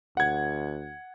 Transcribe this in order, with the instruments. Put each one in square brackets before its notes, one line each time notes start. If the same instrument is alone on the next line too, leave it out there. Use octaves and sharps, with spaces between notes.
[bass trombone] D2 [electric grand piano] F#5 G#6